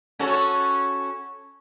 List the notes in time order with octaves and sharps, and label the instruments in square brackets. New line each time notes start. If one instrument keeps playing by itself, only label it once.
[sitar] C#4 F#4 A4